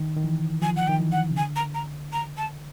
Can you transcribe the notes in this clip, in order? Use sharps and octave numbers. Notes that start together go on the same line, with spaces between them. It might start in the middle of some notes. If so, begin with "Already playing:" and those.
Already playing: D#3
D#3
E3
F3 G#5
F#5
D#3 G5
E3
F#5
C#3
D3 G#5
A#5
A#5
A#5
A5